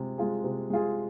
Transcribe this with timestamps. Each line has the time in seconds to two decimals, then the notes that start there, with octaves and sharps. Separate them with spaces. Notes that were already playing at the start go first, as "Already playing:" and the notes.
Already playing: C3 G#3 F4 G#4
0.18 G#3 F4 G#4
0.44 C3
0.70 G#3 F4 G#4